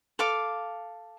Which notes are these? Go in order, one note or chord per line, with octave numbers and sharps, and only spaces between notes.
A4 F5 D6